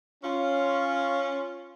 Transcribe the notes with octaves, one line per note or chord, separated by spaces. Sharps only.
C#4 F4